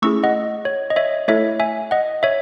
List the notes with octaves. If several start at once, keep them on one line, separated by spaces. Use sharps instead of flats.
A3 C#4 E4 G#4 C#6 E6
D#5 F#5
C#5
D#5
C#5 E5
A3 E4 A4 C#5 E5
E5 G#5
D#5 F#5
C#5 E5